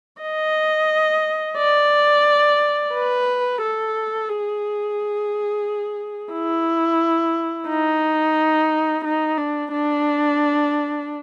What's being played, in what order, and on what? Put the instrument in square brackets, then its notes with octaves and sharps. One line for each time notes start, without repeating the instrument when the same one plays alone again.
[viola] D#5
D5
B4
A4
G#4
E4
D#4
D#4
D4
D4